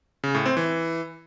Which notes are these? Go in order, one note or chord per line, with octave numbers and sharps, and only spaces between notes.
C#3
A2
C4
E3